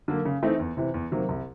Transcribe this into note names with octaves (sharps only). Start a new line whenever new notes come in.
D3 F#3 A#3
C#3
E3 A3 C4 D#4
E2
C3 E3
E2
C3 D#3 F#3 A#3
C2